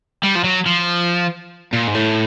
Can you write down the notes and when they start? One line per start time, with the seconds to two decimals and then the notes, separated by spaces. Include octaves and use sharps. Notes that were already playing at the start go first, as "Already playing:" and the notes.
0.24 G3
0.36 F3
0.44 F#3
0.66 F3
1.73 A#2
1.88 G#2
1.95 A2